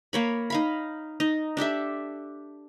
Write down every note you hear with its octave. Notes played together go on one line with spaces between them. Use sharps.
A#3 C#5 B5
D#4 F5 B5
D#4
D4 G4 A4 E5